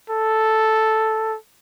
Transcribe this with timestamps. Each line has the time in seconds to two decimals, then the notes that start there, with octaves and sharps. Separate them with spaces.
0.10 A4